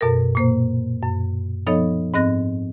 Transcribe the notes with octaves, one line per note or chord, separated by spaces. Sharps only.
F#2 B2 A4 A#4
A#2 A#3 C5
F#2
F3 B3 D#4 A4 C#5 D#5
G#2 C4 D#5 F#6 A#6